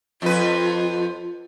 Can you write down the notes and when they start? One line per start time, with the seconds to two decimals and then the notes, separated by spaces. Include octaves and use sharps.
0.22 F2 F4 B4